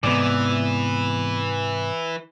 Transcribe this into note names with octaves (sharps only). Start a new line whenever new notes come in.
G#2 C3 E3 B3 D5